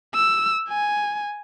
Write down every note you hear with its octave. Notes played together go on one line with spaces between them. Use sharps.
E6
G#5